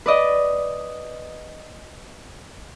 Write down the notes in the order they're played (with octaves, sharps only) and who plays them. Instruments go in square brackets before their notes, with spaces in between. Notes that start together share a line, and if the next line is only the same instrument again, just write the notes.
[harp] B4 D5 D#5